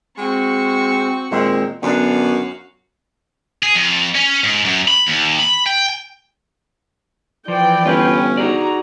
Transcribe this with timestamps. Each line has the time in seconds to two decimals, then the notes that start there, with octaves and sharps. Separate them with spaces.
0.18 G#3 C4 F#4 C#6
1.31 D#2 A#2 G#3 C4
1.83 F#2 D3 B3 D4 F#4 F5
3.63 G#4
3.75 F2
4.15 C#4
4.44 G#2
4.65 F#2
4.88 B5
5.07 D#2
5.40 B5
5.67 G5
7.48 E3 F3 D5 G5
7.86 G1 C#4 F4 B4
8.37 D#4 F#4 G#4 D5 A#5